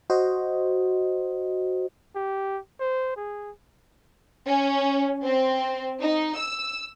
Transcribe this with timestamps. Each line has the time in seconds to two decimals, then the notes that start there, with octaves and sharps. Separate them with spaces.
0.10 F#4 C5 D#5
2.16 G4
2.80 C5
3.17 G#4
4.46 C#4
5.24 C4
6.00 D#4
6.37 E6